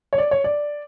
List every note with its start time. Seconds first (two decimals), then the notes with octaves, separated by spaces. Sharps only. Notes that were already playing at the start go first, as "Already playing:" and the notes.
0.13 C#5
0.18 D5
0.31 C#5
0.44 D5